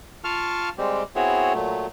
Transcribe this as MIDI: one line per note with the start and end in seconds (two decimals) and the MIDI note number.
0.24 0.69 65
0.24 0.69 77
0.24 0.69 81
0.24 0.69 85
0.24 0.69 89
0.78 1.03 55
0.78 1.03 56
0.78 1.03 60
0.78 1.03 67
1.16 1.53 59
1.16 1.53 60
1.16 1.53 64
1.16 1.53 66
1.16 1.53 68
1.16 1.53 73
1.54 1.87 46
1.54 1.87 54
1.54 1.87 57